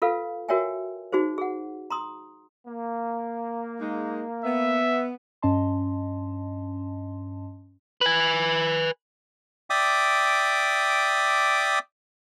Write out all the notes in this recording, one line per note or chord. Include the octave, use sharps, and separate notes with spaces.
F4 A4 B4 F5
F#4 A#4 C#5 E5 G5 G#5
D#4 F#4 G#4 C5
G#4 F#5
A#5 C6 D#6
A#3
G#3 D#4
B3 E5
G2 C#4 D#5 A5 C6
B4 G#5
D5 E5 G5 D6 D#6